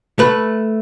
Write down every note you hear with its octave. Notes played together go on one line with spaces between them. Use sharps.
A3 B4